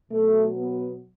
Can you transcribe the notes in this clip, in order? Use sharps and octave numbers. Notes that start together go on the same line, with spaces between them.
B2 F#3 A3
B3